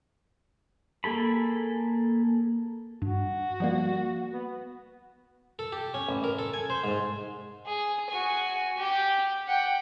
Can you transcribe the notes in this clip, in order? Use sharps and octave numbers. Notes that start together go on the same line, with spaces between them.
A#3 G#4 A4 B5
G2 F#4
F3 G3 A#3
B3
A4
G4
C#4
A1
A#4
A4
G#5
C5
G#2
G#4
F#4 G#5
G4
F#5 G5